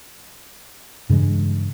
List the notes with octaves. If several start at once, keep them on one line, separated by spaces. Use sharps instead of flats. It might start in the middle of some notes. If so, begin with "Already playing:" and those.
G2 C#3 E3 G#3